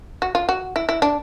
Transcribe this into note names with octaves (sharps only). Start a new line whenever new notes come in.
F#4
F4
F#4
E4
E4
D4